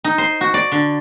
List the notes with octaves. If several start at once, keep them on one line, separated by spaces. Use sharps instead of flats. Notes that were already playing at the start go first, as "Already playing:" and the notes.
D#4
C5
F#4
D5
D3